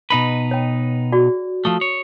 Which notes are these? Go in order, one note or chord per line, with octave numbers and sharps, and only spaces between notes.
B2 D#4 B4 B5
C#5 G5
F#4 G#4 D5
F3 A3 D#6
C#5